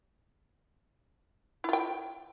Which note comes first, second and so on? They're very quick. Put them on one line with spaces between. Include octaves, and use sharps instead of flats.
E4 F4 G5